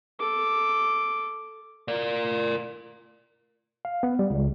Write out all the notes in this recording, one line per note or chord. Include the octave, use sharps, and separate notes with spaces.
A4 D6
A#4 D5
F5
B3
G3
C#2